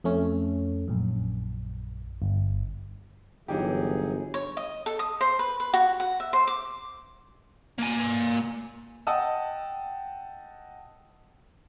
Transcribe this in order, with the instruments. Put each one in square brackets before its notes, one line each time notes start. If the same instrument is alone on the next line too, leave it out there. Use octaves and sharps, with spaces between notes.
[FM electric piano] F2 A3 C#4
A#1 F#2
G1
[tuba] G1 [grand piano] E3 D#4 G4 [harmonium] F#3 G#4
[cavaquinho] C#5
D#5
A4
D#6
C5
B4
B4
F#4
F#5
E5
C5
D6
[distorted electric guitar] A#3 G#5
[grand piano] D#5 F#5 G5 A5 D#6 E6